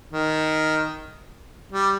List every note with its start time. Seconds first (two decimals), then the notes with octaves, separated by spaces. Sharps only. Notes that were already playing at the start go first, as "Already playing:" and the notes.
0.12 D#3
1.72 G3